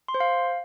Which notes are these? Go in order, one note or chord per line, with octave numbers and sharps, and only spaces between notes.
C6
C5
F5